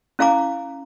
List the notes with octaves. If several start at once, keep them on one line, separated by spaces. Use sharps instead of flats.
C#4 E4 F5 G#5 A#5 D6